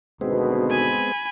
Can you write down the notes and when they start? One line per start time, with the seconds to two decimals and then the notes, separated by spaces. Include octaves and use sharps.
0.21 G#1 D2 B2 G#3 B3 C4
0.70 G#5 B5